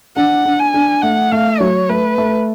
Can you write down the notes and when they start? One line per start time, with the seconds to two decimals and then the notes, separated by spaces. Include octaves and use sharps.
0.17 D4 F#5
0.45 D4
0.60 G#5
0.74 D4
1.02 A3 F#5
1.32 A3 F5
1.60 F#3 C#5
1.89 A3 B4
2.18 A3